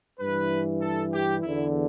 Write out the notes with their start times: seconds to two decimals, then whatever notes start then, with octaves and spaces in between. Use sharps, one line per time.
0.19 G2 E3 B4
0.81 A4
1.13 G4
1.43 E2 D3 E4